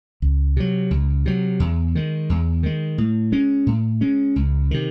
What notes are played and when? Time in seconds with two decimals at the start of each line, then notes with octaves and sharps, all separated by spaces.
0.22 C#2
0.57 C3 F#3
0.91 C#2
1.26 C3 F#3
1.60 E2
1.95 D#3 G#3
2.30 E2
2.63 D#3 G#3
2.98 A2
3.32 G#3 C#4
3.66 A2
4.01 G#3 C#4
4.36 C#2
4.71 C3 D#3